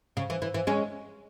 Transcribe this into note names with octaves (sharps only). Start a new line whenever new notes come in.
C#3
E3
E3
E3
G#3 C#4